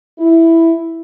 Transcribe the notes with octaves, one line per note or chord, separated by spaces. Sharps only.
E4